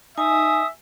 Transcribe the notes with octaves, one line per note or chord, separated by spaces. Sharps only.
D#4 E5 G#5 D#6